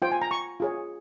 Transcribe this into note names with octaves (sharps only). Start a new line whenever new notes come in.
F4 C5 G5
G#5
A#5
C#6
F4 G#4 C#5